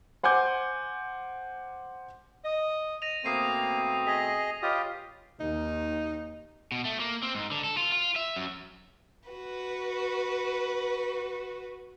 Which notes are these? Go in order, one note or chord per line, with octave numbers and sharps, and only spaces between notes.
C5 F#5 G#5 D6 G6
D#5
A#6 D#7 F7
B2 A3 A#3 C4 D#6 C7 D#7
G#4 D#5 B6
F4 G4 B4 C#5 D#5
D#2 D#4
B2
A3
A#3
C4
G#2
D3
A4
F4
F4
E5
F#2
F#4 B4